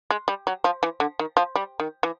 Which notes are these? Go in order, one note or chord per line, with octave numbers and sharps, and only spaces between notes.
G#3
G3
F#3
F3
E3
D3
D#3
F3
G3
D#3
E3